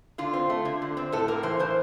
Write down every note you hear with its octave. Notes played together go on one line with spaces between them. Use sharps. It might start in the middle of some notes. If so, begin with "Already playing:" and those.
D3 F4
C4
A3
D3
D3
C4
A2 A4
A#3 A#4
E3 C5
A2 C5